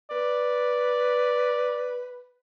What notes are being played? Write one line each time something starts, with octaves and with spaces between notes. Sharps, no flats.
B4 D5